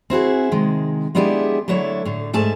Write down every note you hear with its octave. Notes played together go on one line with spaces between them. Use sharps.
C4 E4 F#4 G#4
C3 D#3 G#3
G#3 B3 D4 E4 G4 G#4
D3 F#3 A3 E4 A4 C#5
A2 D3
G#2 A3 G#4 A5